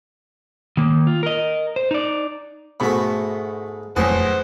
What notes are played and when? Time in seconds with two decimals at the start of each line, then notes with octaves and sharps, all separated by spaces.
0.77 D#3 A#3
1.07 F4
1.23 A#4 D#5
1.76 C5
1.91 D#4 D5
2.80 G#2 B2 A3 B5
3.96 E1 F2 A2 E3 F#3 G#4 C5 F#5